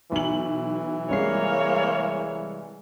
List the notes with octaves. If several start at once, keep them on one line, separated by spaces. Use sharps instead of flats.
B1 E3 F#7
C2 G#3 A#3 C#5 C7